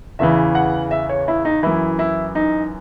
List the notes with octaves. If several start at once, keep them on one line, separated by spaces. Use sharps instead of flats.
E2 C#3 E3 E5
F#5
E5
C#5
E4
D#4
F#2 E3 E4
E4
D#4